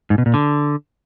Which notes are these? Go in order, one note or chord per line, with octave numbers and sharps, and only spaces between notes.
G#2
B2
A#2
D3